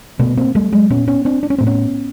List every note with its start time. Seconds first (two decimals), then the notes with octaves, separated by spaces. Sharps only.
0.19 B2 A3 B3
0.37 A#3 C4
0.55 G3 A3
0.72 F#3 G#3
0.90 A#2 B3 C#4
1.07 B3 C#4
1.25 C4 D4
1.43 D4
1.50 C#4
1.58 A2 C4
1.67 B3 C#4